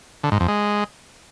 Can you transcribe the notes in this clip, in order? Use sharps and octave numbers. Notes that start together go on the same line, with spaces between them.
D3
G#2
F2
G#3